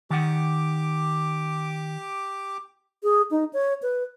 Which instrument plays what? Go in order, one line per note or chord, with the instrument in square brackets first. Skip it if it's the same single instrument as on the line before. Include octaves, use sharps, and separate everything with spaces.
[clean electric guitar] D#3 F#5 [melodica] G4 D6
[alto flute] G#4
D#4
C#5
B4